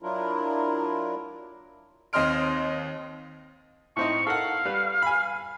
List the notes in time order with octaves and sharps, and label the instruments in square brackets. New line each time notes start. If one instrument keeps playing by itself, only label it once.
[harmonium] F#3 D4 E4 F4 A#4
[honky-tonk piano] D#2 C4 D#5 C6 F6 D7
[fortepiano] A2 C4 D#4 [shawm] C#6
[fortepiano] A4 A#4 F#5 [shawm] F5
[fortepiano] G3 B4
G#5 B5